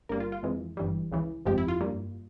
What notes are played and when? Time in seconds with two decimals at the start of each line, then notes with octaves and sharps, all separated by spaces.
0.09 G1 G2 G3 A#3 A#4
0.20 F4
0.32 F4
0.43 F2 E3 G#3
0.77 G1 G2 E3 G3
1.11 C#2 C#3 E3
1.46 G1 F2 C3 F3 G#3 G4
1.58 E4
1.68 F4
1.81 G2 G3 A#3